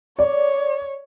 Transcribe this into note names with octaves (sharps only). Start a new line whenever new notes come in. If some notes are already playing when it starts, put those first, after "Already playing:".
C#5 D5